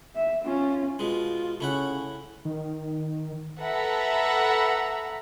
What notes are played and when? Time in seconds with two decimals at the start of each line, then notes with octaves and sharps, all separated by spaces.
0.16 E5
0.45 C#4 F4
0.99 B2 G#3 F4
1.61 C#3 A3 E4 F#5
2.45 D#3
3.59 A4 B4 E5 F#5 A#5 B5